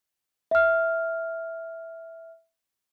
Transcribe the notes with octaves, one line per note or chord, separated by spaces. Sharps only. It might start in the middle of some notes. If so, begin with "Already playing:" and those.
E5 F6